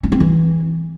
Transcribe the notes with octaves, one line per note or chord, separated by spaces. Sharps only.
C#4
C4
E3